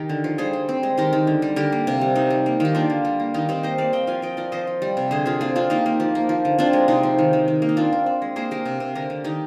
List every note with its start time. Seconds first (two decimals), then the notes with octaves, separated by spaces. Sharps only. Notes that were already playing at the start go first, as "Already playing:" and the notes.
Already playing: D#3 G4 A#4
0.09 D3
0.24 F3
0.38 G3 G#4 C5
0.53 G3
0.69 C4
0.83 G#3
0.98 D#3 G4 A#4
1.13 D#3
1.27 D3
1.42 G3
1.56 D3 G4 A#4
1.72 A#3
1.87 C3
2.01 G3
2.15 G3 D#4
2.30 G3
2.46 A#3
2.60 D#3 G4
2.75 A#3 D4 F4
2.90 D3
3.05 G3
3.20 A#3
3.34 D#3 D#4 G4
3.49 C4 D#4 G4
3.63 A#3 C5 D#5
3.78 A#3 D5 F5
3.93 C4 D#5 G5
4.07 F3 F5 G#5
4.22 F3 D#5 G5
4.37 F3 A#4 D5
4.52 F3 C5 D#5
4.67 F3
4.82 G3
4.97 C3
5.11 D3 G#4 C5
5.26 F3 F4 G#4
5.41 C4 F4 G#4
5.55 C4 D4 F4
5.70 A#3 D#4 G4
5.86 A#3
6.00 F3
6.15 A#3
6.29 F3
6.45 D3
6.58 C4 D4 F4
6.73 G#3
6.88 C3 D#4
7.03 F3
7.19 D#3
7.33 D#3
7.48 D#3
7.62 A#3
7.69 D#4
7.77 C4 D4 F4
7.93 C4
8.06 C4
8.22 G#3
8.36 A#3 G#4 C5
8.51 A#3 G4 A#4
8.65 C3
8.80 C3
8.95 D3 G4 A#4
9.10 D3
9.24 D#3 D#4 G4